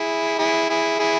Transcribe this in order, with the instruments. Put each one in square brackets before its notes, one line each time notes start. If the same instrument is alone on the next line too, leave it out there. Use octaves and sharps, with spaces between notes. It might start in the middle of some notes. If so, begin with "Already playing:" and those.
Already playing: [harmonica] E4 G#4
E4 G#4
E4 G#4
E4 G#4